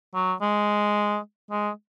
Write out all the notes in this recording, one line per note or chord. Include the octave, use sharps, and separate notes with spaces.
F#3
G#3
G#3